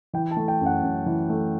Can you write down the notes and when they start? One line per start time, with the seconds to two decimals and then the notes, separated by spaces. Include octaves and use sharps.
0.13 E3 G5
0.31 A5
0.37 A3
0.48 G5
0.61 F#2
0.66 F#5
0.83 F#2
1.06 E3
1.30 A3